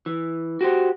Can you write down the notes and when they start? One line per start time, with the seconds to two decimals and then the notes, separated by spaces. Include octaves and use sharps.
0.06 E3
0.61 F#4 G4 C5